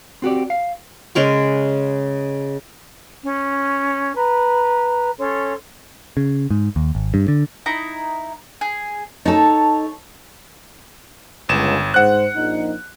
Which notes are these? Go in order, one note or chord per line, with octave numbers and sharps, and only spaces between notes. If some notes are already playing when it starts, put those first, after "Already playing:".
C4 F#4 G4 D5
F5
C#3 G#3 A#4 C#6
C#4
B4 A#5
C#4 A4 C#5 C6
C#3
G#2
D#2
G#1
G2
D3
D#4 E4 A#5
G#4
D#4 A4 C#5 A5
G1 C#2 E7
G#2 C5 F#5 F#6
A#1 D#4